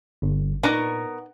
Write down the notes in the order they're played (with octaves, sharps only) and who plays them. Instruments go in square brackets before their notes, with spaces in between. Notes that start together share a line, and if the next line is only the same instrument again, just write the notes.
[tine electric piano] G1
[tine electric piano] A#2 [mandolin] B3 A#4 C#6 [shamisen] D4 D#4